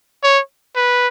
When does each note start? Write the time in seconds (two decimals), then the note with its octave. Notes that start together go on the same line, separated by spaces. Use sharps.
0.24 C#5
0.76 B4